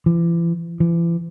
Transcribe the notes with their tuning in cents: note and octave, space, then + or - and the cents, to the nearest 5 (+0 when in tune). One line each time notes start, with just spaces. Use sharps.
E3 +40
E3 +40